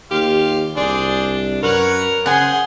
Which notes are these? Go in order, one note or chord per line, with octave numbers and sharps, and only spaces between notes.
D#2 F4 G4 F5
C2 D4 G#4 C5 D5
F#2 A#4 B4 C#5 F#5
C#3 G#4 C5 F#5 G#5